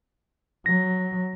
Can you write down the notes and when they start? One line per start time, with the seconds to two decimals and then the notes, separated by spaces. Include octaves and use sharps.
0.66 F#3 A#6